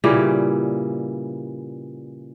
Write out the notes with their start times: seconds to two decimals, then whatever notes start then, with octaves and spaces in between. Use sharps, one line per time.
0.04 A#2 C#3 E3 G3